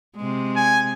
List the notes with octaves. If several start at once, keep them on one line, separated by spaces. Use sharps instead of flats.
C3 G#3
G#5